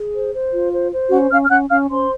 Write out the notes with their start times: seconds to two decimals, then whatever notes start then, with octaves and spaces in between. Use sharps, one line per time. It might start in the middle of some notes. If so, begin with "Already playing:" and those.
Already playing: G#4
0.13 C5
0.33 C5
0.53 F4
0.73 C5
0.91 C5
1.11 C#4 F#4 F#5
1.31 C#4 F5 F6
1.44 F6
1.50 C#4 F#5 F#6
1.70 C#4 F5 F6
1.90 C#4 C5 C6